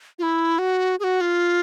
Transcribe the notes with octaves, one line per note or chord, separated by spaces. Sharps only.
F4
E4
F#4
G#4
F#4
F4